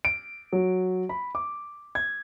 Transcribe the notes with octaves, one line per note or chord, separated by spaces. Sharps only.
D7
F#3
B5
D6
G#6